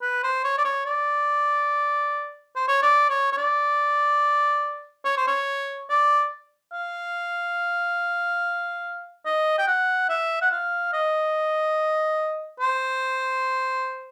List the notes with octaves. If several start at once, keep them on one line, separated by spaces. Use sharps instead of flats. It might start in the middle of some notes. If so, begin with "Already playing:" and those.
B4
C5
C#5
D5
C#5
D5
C5
C#5
D5
C#5
C#5
D5
C#5
C5
C#5
D5
F5
D#5
G5
F#5
E5
F#5
F5
D#5
C5